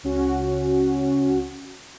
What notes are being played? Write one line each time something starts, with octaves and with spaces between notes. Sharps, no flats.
C#2 C#4 F#4